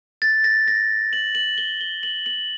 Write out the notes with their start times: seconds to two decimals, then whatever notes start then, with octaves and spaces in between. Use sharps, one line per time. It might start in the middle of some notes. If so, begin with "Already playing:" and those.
0.22 A6
0.44 A#6
0.68 A#6
1.13 F#7
1.35 F#7
1.58 G7
1.81 G7
2.03 F#7
2.26 F#7